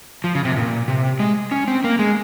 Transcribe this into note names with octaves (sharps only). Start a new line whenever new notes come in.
F3
C#3
C3
G#2
A#2
C3
G#3
C#4
C4
A#3
G#3